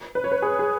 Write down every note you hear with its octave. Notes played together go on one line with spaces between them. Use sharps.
B4
C#5
B4
G#4
G#4